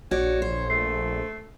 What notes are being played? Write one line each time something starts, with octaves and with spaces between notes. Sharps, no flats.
A#1 F#4 C#5 D5
C5
A3 C7